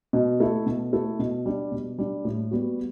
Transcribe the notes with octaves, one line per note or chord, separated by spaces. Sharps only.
B2
A3 E4 A4
B2
A3 E4 A4
B2
G3 D4
B2
G3 D4
A2
G3 B3 F#4